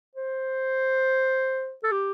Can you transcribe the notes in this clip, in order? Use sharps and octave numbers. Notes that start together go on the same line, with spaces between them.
C5
A4
G4